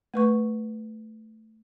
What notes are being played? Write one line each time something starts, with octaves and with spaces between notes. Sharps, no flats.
A3 B4 C#6